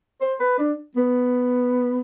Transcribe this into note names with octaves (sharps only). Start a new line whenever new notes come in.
C5
B4
D4
B3